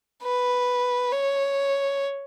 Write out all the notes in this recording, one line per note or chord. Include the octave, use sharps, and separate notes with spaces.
B4
C#5